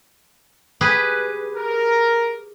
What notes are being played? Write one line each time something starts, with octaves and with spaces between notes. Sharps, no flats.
G4 G#4 B4
A#4